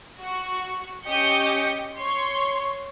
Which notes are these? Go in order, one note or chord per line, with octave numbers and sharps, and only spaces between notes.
F#4
C#4 G4 D#5 G6 C#7
C#5 C6